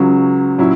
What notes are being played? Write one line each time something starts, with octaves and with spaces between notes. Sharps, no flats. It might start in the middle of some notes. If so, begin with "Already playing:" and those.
Already playing: C#2 C#3 F#3 C#4
A#2 F#3 C#4 E4